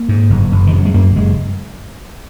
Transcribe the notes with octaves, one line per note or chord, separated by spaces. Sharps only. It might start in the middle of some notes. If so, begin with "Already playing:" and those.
Already playing: A#3
G#2
F#1
F#1
D#3
F#2 F#3
G#3
F#2 A#3
F#1 G#3